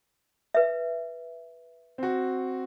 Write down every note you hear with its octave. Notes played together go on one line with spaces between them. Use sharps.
B4 E5
C4 F#4